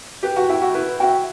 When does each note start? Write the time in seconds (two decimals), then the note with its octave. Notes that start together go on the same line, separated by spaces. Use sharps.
0.23 G4 B4
0.36 F#4
0.49 E4 E5 G5
0.62 F#4
0.74 E4 B4
1.00 F#4 E5 G5